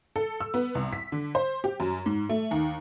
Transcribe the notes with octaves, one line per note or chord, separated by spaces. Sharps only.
A4
E6
B3
C2
B6
D3
C5
G4
F#2
G#2
A3
D#2